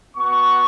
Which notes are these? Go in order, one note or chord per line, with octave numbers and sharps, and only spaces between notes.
B3 F#4 C#6